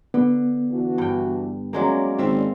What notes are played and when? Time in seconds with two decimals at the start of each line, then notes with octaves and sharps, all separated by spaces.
0.14 D3 B3
0.70 E3 D4 F#4
0.98 G2 G5
1.73 F#3 G#3 A#3 C#4 D5
2.18 G#1 C4 E5 F5